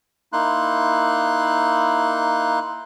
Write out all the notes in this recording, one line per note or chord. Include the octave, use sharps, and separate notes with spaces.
A#3 D#4 E4 C6 F#6